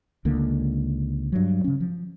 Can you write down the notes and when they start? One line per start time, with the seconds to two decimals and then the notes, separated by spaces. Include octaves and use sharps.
0.25 C#2 D3 A#3
1.32 G2 F#3
1.64 C#3 C#4
1.80 F3